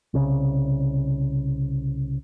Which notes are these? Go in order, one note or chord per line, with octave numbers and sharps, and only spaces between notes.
C2 C#3